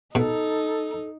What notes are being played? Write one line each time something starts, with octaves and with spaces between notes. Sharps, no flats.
B2 D#4 A4